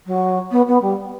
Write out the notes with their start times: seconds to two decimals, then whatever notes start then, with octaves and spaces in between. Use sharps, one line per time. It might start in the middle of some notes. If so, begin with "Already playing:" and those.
0.06 F#3
0.51 B3
0.68 B3
0.82 G3